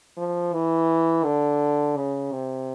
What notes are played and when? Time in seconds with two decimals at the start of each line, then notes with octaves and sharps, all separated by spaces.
0.18 F3
0.53 E3
1.25 D3
1.97 C#3
2.32 C3